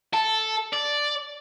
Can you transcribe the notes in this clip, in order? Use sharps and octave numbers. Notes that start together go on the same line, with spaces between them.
A4
D5